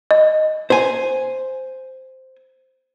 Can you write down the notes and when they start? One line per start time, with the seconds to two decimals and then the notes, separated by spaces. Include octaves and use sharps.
0.11 D#5
0.70 C5 G#5